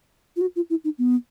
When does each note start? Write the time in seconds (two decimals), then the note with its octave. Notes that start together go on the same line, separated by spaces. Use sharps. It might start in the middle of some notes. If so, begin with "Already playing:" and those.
0.36 F4
0.41 F#4
0.56 F4
0.70 E4
0.84 D#4
0.98 B3